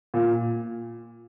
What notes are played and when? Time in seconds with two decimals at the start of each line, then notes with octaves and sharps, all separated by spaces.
0.14 A#2